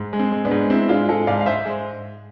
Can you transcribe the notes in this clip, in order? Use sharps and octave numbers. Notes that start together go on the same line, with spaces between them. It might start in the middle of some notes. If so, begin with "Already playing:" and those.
Already playing: G#2
G#3
C4
G#3
B3 D4
G#2
G#2 C4 E4
G#3 D4 F4
G#3 F4 A4
G#2 D5 F5
F5
G#2 C5 E5
G#3